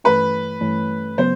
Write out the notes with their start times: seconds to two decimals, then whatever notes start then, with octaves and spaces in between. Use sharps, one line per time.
0.04 G2 E3 A3 C#4 B4
0.61 G2 E3 A3 C#4
1.18 C#3 F#3 B3 C5